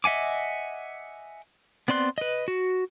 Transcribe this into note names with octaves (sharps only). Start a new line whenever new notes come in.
D#5 E5 F#5 G#5 D6
B3 C4 D5 C6 F#6
B4 D#5
F#4